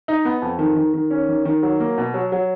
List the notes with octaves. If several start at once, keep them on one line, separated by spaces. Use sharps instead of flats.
D#4
B3
F2
D#3
D#3
D#3
C#4
D#3
D#3
F#3
A#3
B2
F#3
F#3